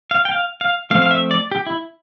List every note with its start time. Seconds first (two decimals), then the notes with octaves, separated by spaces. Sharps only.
0.11 F5
0.25 G5
0.31 F5
0.61 F5
0.90 F3 A3 C4 F5
1.02 F5
1.11 E5
1.31 D5
1.52 G4
1.66 E4